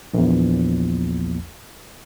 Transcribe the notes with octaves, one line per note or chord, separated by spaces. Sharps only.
A#1 E2